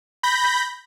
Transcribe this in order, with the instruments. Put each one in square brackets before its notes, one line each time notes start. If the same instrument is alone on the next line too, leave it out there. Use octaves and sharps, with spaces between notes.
[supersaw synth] B5 G6 A#6